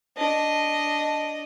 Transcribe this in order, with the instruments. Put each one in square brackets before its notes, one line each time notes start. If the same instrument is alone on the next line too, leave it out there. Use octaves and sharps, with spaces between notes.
[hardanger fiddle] D4 D#5